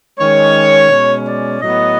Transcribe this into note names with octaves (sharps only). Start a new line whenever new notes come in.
D#3 G#3 C#4 C#5
B2 G#3 C#4
D5
A2 F#3 B3 D#5